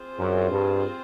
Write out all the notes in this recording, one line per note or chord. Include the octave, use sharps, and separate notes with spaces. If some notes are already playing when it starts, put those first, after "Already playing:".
Already playing: C4 F4 G#4 C5
F#2
G2